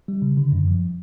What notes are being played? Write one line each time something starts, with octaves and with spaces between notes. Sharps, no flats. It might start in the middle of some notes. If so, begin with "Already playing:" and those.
G3
C#3
D3
F#2
F3